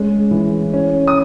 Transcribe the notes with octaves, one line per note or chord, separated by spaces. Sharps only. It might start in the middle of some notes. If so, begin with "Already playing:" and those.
Already playing: G#3 C#4
E3
C#4
D#6